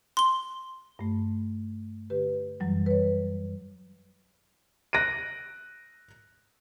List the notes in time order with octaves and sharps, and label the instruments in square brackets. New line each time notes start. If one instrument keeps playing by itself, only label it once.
[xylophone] C6 G7
[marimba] G2 A3
D3 G4 B4
F#2 E3 F#3 G3
B4 C#5
[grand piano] F#6 A#6 D7 D#7